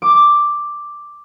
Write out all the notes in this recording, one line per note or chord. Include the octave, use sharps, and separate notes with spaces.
D6